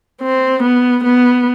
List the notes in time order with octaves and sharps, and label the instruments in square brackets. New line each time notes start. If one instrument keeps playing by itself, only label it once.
[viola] C4
B3
B3